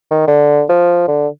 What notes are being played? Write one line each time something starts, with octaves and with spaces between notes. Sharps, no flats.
D#3
D3
F3
D3